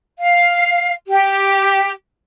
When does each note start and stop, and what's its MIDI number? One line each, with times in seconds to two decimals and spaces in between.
0.19 0.92 77
1.07 1.91 67